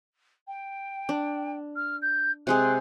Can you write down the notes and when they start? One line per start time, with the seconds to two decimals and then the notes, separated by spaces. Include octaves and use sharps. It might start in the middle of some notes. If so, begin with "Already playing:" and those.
0.48 G5
1.09 D4
1.76 F6
2.02 G6
2.47 C3 G#3 G#4 F#6